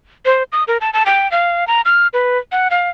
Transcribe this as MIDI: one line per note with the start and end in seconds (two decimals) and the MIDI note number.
0.26 0.43 72
0.52 0.64 87
0.68 0.78 70
0.81 0.90 81
0.93 1.03 81
1.06 1.30 79
1.32 1.67 77
1.67 1.81 82
1.85 2.07 89
2.13 2.38 71
2.52 2.68 78
2.71 2.90 77